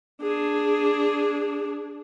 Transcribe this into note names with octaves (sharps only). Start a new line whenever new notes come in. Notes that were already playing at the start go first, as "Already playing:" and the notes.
D4 G#4